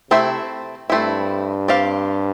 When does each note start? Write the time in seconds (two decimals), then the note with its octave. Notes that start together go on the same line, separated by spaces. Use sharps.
0.11 C3 A3 C4 E4
0.90 G2 A3 C4 E4
1.68 C4 G4 D5 F5